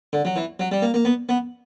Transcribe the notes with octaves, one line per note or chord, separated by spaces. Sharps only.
D3
F#3
E3
F#3
G3
A#3
A#3
B3
B3